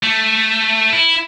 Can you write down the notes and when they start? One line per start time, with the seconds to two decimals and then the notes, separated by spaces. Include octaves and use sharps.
0.03 A3
0.93 E4